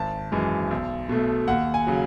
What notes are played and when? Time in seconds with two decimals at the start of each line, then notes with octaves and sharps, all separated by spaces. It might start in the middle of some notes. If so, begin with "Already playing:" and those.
Already playing: G#1 A5
0.32 F#2 E3 G#3
0.71 B1
1.09 B2 A3
1.48 D#2 F#5
1.74 G#5
1.87 C#3 F#3